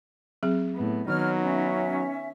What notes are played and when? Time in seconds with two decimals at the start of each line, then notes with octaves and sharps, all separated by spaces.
0.43 F#3 C4 G#4
0.74 A2 B3
1.08 D#3 F#3 B3 D#4 C#5 F6
1.42 C#4 E5